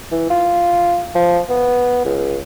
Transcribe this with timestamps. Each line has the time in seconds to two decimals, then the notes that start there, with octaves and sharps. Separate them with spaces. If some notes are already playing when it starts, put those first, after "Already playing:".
0.12 E3
0.30 F4
1.15 F3
1.49 B3
2.05 C#2